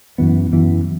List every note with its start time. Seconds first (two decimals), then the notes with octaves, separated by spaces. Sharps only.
0.18 F#2 E3 B3
0.53 F#2 E3 B3